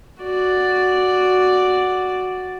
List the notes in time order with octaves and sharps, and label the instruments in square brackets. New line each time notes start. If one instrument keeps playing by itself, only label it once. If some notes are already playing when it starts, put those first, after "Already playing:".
[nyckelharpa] F#4 D5